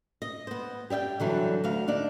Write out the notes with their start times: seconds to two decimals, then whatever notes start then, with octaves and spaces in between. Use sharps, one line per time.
0.22 D#5
0.47 B3 C5
0.90 G4 D5 E5 G5
1.20 D3 E3 F#3 G3
1.64 D2 F#4 F5
1.88 D4 D#4 D5